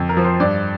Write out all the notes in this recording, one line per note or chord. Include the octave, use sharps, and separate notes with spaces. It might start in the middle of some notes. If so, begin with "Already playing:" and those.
Already playing: F2
A#4
F3
C5
G2 D5